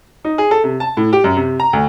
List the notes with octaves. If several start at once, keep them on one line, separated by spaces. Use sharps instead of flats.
D#4
G#4
A4
C3
A5
A2
G4
F#2
C3
A#5
D2